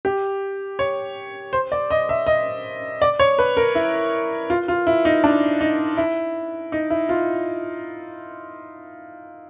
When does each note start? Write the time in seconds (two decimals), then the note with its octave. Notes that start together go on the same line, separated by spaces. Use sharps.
0.05 G4
0.79 C#5
1.53 C5
1.72 D5
1.91 D#5
2.09 E5
2.27 D#5
3.02 D5
3.19 C#5
3.39 B4
3.57 A#4
3.75 E4
4.50 F4
4.68 F4
4.87 E4
5.05 D#4
5.24 D4
5.61 D#4
5.97 E4
6.72 D#4
6.90 E4
7.09 F4